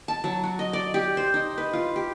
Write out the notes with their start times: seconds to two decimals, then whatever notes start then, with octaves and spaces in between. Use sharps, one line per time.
0.08 A5
0.24 F#3
0.44 F#4
0.59 D#5
0.73 D5
0.94 G4
1.17 C5
1.34 D#4
1.58 B4
1.73 F4
1.96 G4